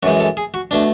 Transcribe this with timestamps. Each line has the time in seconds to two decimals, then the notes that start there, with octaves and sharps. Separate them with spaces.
0.03 F#2 E3 G#3 F#4
0.20 A4
0.37 G#4
0.54 F#4
0.71 B2 A3 D4